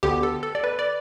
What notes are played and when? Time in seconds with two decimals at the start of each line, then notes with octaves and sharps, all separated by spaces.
0.03 D2 D3 B3 G4
0.23 A4
0.43 A4
0.55 D5
0.64 B4
0.79 D5